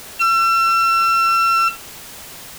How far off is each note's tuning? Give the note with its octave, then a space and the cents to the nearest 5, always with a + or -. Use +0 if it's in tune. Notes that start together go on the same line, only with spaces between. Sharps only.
E6 +40